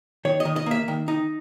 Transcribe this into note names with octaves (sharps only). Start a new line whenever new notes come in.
D#3 C#5
D#5
D#3
D#5
A#3 E5
D#3
D#4